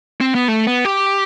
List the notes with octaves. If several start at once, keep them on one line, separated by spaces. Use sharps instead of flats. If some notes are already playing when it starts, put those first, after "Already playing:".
C4
B3
A3
B3
G4